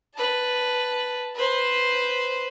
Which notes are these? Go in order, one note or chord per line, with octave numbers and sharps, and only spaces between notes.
B4 A5
B4 C5